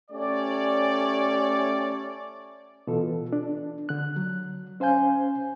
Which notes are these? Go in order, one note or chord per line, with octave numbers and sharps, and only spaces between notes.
A3 C#4 G4 C#5 D5
B2 E3 F4 A4
D4
D3 F#6
F#3
C#4 C5 F5 G#5 G6